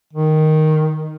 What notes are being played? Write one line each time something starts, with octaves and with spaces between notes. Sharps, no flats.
D#3